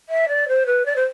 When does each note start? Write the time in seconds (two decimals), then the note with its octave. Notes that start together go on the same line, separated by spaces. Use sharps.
0.09 E5
0.28 D5
0.48 C5
0.66 B4
0.85 D5
0.96 C5